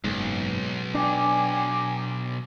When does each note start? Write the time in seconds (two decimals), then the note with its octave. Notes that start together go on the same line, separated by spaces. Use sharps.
0.04 F#1 B1 G#2
0.95 D4 G5 G#5 D6